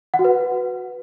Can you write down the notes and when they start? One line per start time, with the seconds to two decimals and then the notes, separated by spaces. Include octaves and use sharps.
0.14 F#5
0.19 F#4
0.25 B4